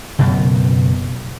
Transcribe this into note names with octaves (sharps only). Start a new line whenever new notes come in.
F#1 F#2 B2 B3